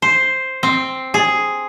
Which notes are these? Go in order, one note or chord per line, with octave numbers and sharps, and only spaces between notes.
C5
C4
G#4